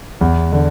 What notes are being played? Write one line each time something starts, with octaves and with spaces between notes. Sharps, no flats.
E2
D3